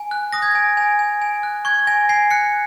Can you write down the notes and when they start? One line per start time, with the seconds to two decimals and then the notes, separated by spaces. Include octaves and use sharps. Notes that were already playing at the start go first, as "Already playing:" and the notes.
Already playing: G#5
0.11 F#6
0.33 D#6 A#6
0.42 G#6
0.51 G#5 A#6
0.77 G#5
0.99 G#5
1.22 G#5
1.43 F#6
1.65 C#6 G#6
1.87 G#5 A#6
2.09 G#5 C7
2.31 F#6 C#7